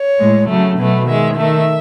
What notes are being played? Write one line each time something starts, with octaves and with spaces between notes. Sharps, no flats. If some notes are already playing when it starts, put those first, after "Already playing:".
Already playing: C#5
A2 G#3
C#3 F#3 A3
B2 F#3 A3 B4
D#3 G#3 E5
D#3 A3 E5